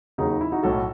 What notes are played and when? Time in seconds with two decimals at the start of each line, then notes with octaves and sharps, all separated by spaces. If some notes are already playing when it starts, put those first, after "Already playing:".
0.18 D#2 C#3 F#3 D#4
0.30 D#4
0.41 E4
0.52 D#4 F#4
0.63 B1 A2 F#3 F#4 A4